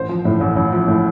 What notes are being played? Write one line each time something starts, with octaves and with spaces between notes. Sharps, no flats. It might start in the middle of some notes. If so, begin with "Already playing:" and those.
Already playing: A1 C5
F3
A2
A1
A1
F3
A2